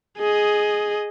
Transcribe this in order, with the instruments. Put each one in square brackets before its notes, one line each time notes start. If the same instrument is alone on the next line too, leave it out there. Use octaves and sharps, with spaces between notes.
[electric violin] G#4 D#5